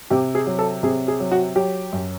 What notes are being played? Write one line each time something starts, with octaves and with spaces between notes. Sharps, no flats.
C3 G4
G#4
F#3
A4
C3 G#4
G#4
F#3
F#4
F#3 G4
F#2